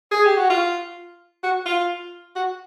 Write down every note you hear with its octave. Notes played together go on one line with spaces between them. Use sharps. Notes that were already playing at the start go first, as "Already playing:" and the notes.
G#4
G4
F#4
F4
F#4
F4
F#4